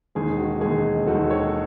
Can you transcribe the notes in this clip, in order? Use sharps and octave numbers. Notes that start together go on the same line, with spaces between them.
E1 D#2 D#3 G#3 G#4
F#4
E1 D#2 D#3 G#3 G#4
E1 D#2 D#3 G#3 F#4 A4
A4 C#5